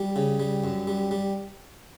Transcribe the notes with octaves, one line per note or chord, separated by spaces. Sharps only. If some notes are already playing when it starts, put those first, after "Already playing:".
Already playing: G3
C#3
G3
F#2
G3
G3